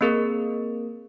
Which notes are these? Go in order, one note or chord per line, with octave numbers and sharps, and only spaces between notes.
A#3 C4 G#4 A#4